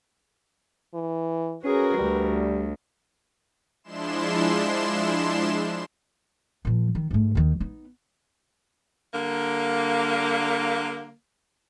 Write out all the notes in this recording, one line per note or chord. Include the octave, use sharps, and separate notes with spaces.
E3
C#4 F#4 G#4 A#4 B4
D2 G3
F3 G#3 D4 E4 C6 E7
A#2 F3
D#3
G#2 A3
D#2 D#3
B3 D#4
D3 G3 A#3